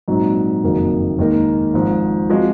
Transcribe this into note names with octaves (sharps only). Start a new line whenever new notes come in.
A#1 G#2 F#3 C4 D#4
F#1 F2 D#3 F#3 A#3
D#2 D#3 G#3 D#4 A#4
G#1 G#2 F3
F3 G#3 C4 F#4